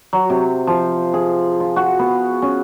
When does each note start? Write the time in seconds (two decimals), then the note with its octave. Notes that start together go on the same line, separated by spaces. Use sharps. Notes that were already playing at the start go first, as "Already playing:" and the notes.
0.13 F#3
0.30 C3
0.67 F3
1.14 G#4
1.60 F4
1.76 F#4
1.99 B3
2.42 C#4